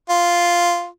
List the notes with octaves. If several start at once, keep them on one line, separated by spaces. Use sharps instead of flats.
F4